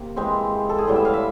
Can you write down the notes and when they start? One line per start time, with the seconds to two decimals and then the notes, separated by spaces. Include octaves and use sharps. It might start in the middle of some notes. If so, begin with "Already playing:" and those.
Already playing: C3 A#3
0.16 E3 G#3 C4
0.69 A4
0.78 G#4
0.87 A2 E3 G3 B3
0.96 E5
1.05 F5
1.14 E5